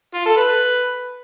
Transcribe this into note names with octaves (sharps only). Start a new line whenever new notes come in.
F4
A4
B4